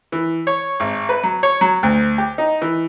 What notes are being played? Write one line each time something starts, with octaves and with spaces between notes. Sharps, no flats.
E3
C#5
G#1
B4
F#3
C#5
F#3
D2
G4
D#4
E3